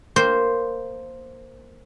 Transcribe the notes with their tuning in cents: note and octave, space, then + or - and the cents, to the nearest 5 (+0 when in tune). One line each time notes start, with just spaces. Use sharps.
A#3 -5 C5 +0